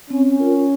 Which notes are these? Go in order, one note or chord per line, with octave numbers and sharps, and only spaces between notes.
C4 C#4
F4 A#4